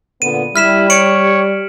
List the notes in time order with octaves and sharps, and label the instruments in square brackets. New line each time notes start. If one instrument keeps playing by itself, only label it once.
[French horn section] A#2 D3 B3 [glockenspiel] D#7
[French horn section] G3 [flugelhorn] E4 [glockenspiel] F6 B6 E7
[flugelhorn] C#5 [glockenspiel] C#7 D7 F#7